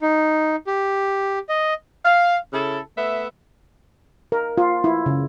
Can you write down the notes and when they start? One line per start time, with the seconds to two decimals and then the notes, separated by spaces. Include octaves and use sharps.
0.01 D#4
0.67 G4
1.49 D#5
2.05 F5
2.53 C#3 E4 A4
2.97 A3 B3 E5
4.32 A#4
4.58 F4
4.84 E4
5.06 C#3